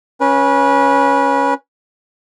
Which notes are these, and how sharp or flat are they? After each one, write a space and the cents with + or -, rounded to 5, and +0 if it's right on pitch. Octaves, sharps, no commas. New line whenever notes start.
C#4 +0 B4 -25